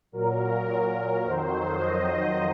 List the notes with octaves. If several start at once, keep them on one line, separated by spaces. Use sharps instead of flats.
A#2 F#3 A#4
F2 D#3 F#3 C5
D#5